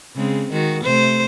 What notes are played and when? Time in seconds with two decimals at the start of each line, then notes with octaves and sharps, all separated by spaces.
0.16 C#3 G#3 C4
0.52 D#3 G#3 F#4
0.84 C3 A3 C5